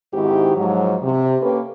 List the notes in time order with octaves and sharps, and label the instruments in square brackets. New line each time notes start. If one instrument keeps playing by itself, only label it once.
[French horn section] G#2 D#3 C4 E4 F#4 G4
G#2 F3 F#3
C3
A#3 C#4 G4 A4 B4